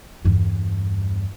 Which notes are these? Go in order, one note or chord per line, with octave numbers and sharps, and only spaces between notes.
E2 G2